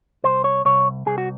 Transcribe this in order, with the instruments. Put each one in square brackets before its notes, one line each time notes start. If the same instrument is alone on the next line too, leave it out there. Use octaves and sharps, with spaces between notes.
[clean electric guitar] C2 C5
C#5
C2 C#5
C2 G#4
F#4